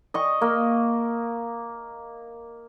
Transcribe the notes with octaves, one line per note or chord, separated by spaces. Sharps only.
D#5 C#6
A#3